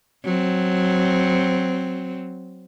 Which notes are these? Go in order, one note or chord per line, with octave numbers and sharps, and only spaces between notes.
F#3 C4